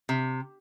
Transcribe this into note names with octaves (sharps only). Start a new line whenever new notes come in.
C3